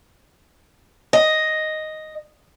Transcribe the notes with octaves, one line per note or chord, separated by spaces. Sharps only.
D#5